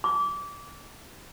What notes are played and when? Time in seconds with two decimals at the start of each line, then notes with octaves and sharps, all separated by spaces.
0.04 D6